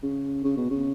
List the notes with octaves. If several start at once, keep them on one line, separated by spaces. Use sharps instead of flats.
C#3
C#3
B2
C#3